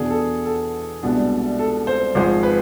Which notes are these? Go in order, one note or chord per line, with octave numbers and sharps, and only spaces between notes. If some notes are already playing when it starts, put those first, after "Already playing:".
Already playing: E2 B2 B3 D4 G#4
A4
G#4
A4
C2 B2 G#3 B3 D4
A4
C5
G#1 G#2 F3 G#3 C5
B4